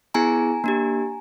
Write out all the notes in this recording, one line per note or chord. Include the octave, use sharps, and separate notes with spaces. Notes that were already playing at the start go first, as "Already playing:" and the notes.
B3 E4 G#4 G#5 A#5
A#3 D4 G4